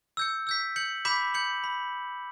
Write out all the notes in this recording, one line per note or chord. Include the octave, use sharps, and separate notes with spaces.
E6 G6 C#7
E6 G6 B6
G6 C#7 F#7
B5 D6 G6 B6 E7
G6 C#7 F#7
B5